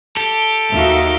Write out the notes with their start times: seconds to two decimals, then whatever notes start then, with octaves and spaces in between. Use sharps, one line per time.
0.17 G4 A4
0.71 D#2 D#4 F#4 E5 F5 A#5